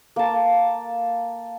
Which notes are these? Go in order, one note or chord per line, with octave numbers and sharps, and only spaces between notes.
A#3 A5